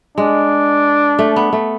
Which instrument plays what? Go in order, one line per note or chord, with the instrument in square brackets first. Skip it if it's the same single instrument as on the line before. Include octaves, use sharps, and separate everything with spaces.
[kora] G#3 [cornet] D4
[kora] A3
B3
A3